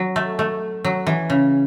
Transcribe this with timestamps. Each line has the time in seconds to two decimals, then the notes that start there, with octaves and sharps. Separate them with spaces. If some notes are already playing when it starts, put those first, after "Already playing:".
Already playing: F#3
0.16 A3
0.39 A3
0.84 F#3
1.07 E3
1.30 C#3